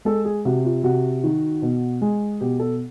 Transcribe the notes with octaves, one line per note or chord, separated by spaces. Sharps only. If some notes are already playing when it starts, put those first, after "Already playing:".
G#3 A4
G#4
C3 F#4
F4
C3 F#4
D#3
B2
G#3
B2 G4
A4